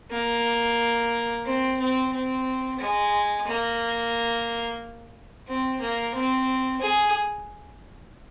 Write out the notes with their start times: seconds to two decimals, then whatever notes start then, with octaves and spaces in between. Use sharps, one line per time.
0.11 A#3
1.45 C4
1.79 C4
2.12 C4
2.79 G#3
3.47 A#3
5.47 C4
5.80 A#3
6.14 C4
6.81 G#4